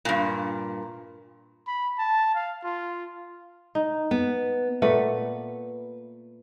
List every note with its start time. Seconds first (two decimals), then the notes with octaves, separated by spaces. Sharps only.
0.05 G2 A#2
1.67 B5
1.98 A5
2.35 F5
2.64 F4
3.75 D#4
4.11 B3
4.82 A#2 A3 B4 F#5